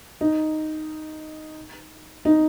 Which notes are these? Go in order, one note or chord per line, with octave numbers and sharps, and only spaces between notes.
D#4
D#4